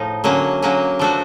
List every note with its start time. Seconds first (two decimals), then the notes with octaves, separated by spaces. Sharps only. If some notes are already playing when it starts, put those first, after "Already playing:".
Already playing: A2 F3 D#4
0.24 D3 F#3 A#3 C#4
0.62 D3 F#3 A#3 C#4
0.99 F3 A3 D4 F#4 A4